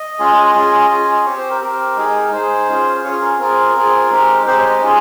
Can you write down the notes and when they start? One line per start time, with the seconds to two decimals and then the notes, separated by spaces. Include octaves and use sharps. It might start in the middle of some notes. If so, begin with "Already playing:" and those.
Already playing: D#5
0.19 G#3 C#4 F4 G#4
0.55 C#4 F4 G#4
0.90 C#4 F4 G#4
1.25 C4 G4 C#5
1.38 C5
1.50 A#4
1.61 C4 G4 A#4
1.96 G#3 D#4 G#4
2.33 G#3 D#4 G#4 C5
2.68 C#4 F4 G#4
3.04 C#4 F4 G#4 C#5
3.21 A#4
3.39 C4 F4 G#4 A#4
3.76 C4 F4 G#4
4.10 G#3 C4 D#4 G4
4.46 G#3 C4 D#4 G4 C5
4.58 C#5
4.70 D#5
4.82 G#3 C#4 F4 G#4